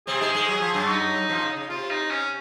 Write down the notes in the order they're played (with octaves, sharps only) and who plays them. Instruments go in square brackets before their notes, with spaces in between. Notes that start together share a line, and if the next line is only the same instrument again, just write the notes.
[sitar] C3 C4 [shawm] G#4
[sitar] G#2 G#3
G#2 G#3
F#3
F3
F#2 F#3
[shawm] D#4
[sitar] F2 F3
C#3
C#3
[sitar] C3 [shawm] F4
[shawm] D#4
C#4